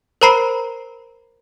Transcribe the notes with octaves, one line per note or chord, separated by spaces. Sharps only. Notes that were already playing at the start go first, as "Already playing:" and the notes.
A#4 C5 A#5 B5 C7 D7